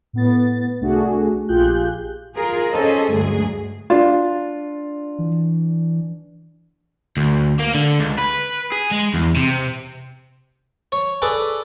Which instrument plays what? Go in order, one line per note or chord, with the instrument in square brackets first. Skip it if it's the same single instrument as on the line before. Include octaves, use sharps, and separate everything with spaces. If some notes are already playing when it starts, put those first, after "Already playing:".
[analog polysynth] A2 B3 A6
C2 A3 D4 F#4 G#4
A#1 F4 G4 G#4 F#6 G6
[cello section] F4 G#4 A#4
C#4 G#4 A4 C5 D#5
D2 G2 F#3 G#3 G#4
[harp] D4 [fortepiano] F4
[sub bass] E3
[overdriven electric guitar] D2
A#3
D3
C#2
B4
G#4
G#3
E2
C3
[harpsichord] C#5
G#4 A4 B4 D5